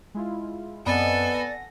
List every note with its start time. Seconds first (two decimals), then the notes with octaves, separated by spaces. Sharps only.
0.15 G#3 E4 F4
0.86 F#2 B3 C4 A4 D5 D#5 G#5
1.34 F#5 A#6